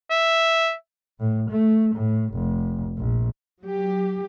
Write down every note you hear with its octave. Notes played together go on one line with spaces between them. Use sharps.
E5
A2
A3
A2
F1
A#1
F#3 G4